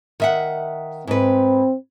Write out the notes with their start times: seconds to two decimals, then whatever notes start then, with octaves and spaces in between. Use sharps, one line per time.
0.20 D#3 E5 F#5
1.07 G#2 C4 B4